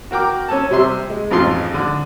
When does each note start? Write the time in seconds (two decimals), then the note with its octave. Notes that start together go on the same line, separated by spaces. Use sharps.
0.11 F#4 A#4 G5 D6
0.48 C#4 A4 A5
0.71 C3 G3 E5 C6
1.10 G#3
1.31 A1 F2 G#2 F4 C6
1.74 D3